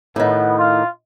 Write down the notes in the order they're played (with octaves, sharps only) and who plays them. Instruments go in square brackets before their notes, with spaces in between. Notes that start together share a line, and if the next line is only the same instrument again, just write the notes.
[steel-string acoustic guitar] A2 D#3 [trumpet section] B3
[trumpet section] F4